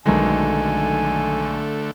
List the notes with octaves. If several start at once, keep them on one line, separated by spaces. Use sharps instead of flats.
B1 F#2 D3 D#3 G#3 A3 G#5